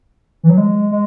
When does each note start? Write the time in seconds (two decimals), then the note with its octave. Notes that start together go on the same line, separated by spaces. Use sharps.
0.43 E3
0.50 F#3
0.58 G#3
0.91 G#3